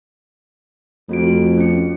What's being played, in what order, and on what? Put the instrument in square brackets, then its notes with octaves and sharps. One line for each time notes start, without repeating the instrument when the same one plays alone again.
[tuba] F2 [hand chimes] A3 F#4 D7
[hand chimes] C#4 C#7